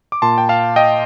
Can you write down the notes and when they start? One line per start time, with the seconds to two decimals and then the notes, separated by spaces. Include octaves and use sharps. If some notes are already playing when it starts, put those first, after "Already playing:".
0.12 D6
0.22 A#2 A5 C6
0.38 G5
0.49 F5 A5
0.76 D#5 G5